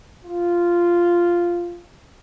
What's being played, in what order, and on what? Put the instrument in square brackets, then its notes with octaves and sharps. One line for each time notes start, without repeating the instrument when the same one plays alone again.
[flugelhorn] F4